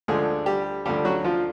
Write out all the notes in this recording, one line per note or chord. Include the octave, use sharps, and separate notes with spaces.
D2 D3 F3 G#3 G#4
G3 G4
D2 D3 F3 G3 G4
F#3 F#4
F3 F4